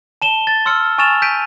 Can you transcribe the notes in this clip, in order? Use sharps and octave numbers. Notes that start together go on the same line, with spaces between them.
A5 E7 G7
A6
C6 E6 F6 C#7
G#5 C#6 F6 A6 E7 F7
G6 B6 D7 D#7